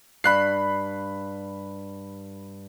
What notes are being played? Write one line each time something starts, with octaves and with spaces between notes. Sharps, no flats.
G2 B5 F#6 C7